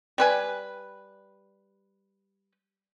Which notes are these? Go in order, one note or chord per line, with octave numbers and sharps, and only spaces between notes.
G3 B4 G#5